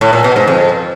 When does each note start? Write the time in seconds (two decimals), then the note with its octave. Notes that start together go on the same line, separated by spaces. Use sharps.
0.01 A2
0.13 A#2
0.24 B2
0.36 G#2
0.47 F2